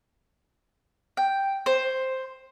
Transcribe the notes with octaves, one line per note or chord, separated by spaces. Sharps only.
G5
C5